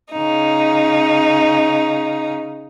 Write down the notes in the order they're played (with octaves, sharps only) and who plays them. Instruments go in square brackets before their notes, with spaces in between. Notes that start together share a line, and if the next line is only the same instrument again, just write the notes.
[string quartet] C#3 D#4